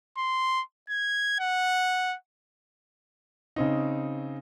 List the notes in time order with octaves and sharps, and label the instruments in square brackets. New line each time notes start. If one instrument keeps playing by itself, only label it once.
[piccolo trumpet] C6
G#6
F#5
[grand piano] C#3 C4 D#4